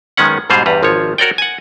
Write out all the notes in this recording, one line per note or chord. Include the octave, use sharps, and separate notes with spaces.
F#2 D#3 G#3 B3 C#4 F#5
G#2 B2 G3 G#4 C5 F5
E2 G2 G3 B4 A#5
G#1 F3 F4 C#5
F#4 A#4 C#5 D5 G5
F#5 G#5